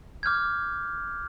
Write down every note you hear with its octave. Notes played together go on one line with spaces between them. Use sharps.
D6 F6 G6 G#6